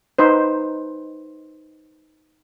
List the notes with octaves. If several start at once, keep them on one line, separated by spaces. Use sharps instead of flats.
D#4 B4 C5